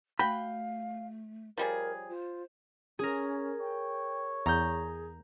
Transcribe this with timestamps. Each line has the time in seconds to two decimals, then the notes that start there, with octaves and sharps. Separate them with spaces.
0.19 A3 F#4 F5 G5 B5
1.58 F3 G3 G#4 A#4 C#5
2.09 F4 C5
2.99 C#4 G#4 A#4
3.61 C#5 G5
4.46 E2 G#4 A#5 G6